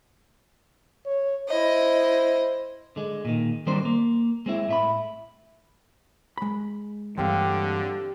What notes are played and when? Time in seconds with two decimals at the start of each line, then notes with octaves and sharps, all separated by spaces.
1.06 C#5
1.49 E4 C5 D#5
2.96 D3 G#3
3.25 A#2 D#3
3.67 D#3 G3 C4 D4 A#4 C5
3.85 A#3
4.46 G#3 C4 E4
4.69 A2 E5 B5
6.38 G#3 B5
7.18 G2 D3 E3 C4 G4 F5